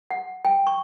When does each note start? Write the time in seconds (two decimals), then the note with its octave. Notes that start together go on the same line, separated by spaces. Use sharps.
0.11 F#5
0.45 G5
0.67 C#6